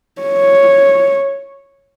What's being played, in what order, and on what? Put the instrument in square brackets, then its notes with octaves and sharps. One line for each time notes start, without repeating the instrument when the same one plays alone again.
[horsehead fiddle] C#5